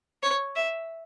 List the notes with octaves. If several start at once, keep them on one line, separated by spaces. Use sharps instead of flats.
C#5
E5